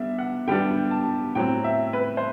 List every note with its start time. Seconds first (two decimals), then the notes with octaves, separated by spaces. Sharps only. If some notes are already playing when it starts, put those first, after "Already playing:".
Already playing: D3 G3 B3 D4 E5
0.19 F#5
0.48 D3 G3 B3 D4 G5
0.91 A5
1.35 A2 F#3 C4 G5
1.64 E5
1.93 B4
2.17 C5